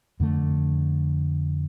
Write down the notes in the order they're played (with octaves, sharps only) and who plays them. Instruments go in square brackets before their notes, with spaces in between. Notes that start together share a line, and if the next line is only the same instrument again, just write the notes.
[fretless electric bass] F2 D3 A3